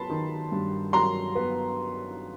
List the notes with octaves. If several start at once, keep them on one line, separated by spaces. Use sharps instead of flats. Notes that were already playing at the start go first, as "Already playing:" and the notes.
Already playing: F#3 B3 A5 B5 C6
D#3
G2
F#3 A#5 C6
B3